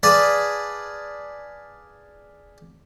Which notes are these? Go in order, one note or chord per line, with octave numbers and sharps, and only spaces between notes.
G#4 B4 D5 F5 A5 B5